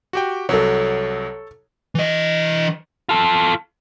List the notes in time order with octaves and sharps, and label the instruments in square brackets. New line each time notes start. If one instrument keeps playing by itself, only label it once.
[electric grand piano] F#4 G4 G5
[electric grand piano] C2 F#3 [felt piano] A4 C#5
[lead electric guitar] E3 D#5
F4 A4